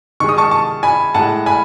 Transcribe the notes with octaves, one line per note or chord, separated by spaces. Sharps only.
D#3 G#3 C#6
D#6
A5 C#6
A5 C#6
G#5 B5
A2 G#3 F#5 A5
G#5 B5